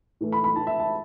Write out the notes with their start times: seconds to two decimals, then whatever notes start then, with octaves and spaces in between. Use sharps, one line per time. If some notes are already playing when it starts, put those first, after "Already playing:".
0.21 A2 E3 A3
0.32 B5
0.44 B5
0.55 A2 E3 A3 A5
0.67 E5
0.79 A5